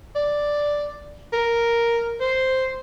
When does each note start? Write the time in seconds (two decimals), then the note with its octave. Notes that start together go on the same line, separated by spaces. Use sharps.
0.15 D5
1.33 A#4
2.20 C5